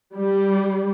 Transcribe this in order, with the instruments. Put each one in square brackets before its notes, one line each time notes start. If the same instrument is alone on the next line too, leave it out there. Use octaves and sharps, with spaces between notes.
[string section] G3